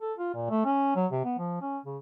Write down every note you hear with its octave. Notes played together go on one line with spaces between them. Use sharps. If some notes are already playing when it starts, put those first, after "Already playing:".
A4
F4
A#2
A3
C#4
F#3
C3
B3
F3
C#4
C#3